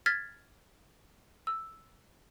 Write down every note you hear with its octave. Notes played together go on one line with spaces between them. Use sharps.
F6 G#6 A6 B6
E6